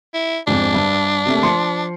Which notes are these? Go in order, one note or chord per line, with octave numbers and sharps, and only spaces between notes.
E4
F2 G#2 D4
G2
C3 A3 A#3
F3 C6 C#7